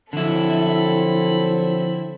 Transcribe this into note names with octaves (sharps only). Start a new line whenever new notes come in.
D3 F3 F#3 C4 E4 A4 B5